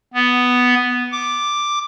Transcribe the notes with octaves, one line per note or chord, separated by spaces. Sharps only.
B3
D6